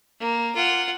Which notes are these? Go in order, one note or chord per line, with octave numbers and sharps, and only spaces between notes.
A#3
F4 F#5